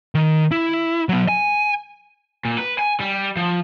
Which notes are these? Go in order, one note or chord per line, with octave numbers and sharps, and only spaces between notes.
D#3
E4
F#3 B3
G#5
A#2
B4
G#5
G3
F3